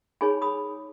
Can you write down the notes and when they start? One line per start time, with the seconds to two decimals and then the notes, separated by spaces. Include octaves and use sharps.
0.21 D#4 G#4 C#5 G#5 B5
0.42 B5 D#6